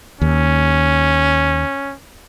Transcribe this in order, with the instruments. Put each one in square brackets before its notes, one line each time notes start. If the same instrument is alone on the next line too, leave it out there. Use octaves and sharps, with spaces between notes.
[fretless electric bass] D#2 [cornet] C#4